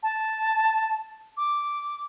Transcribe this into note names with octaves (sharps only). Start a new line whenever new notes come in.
A5
D6